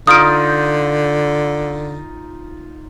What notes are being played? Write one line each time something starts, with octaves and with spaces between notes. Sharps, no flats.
D3 D#4 F4 D#6 F6 D7